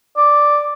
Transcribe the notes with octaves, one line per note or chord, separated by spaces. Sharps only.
D5